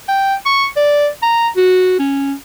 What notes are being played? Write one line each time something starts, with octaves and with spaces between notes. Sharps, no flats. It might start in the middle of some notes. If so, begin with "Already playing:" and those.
G5
C#6
D5
A#5
F#4
C#4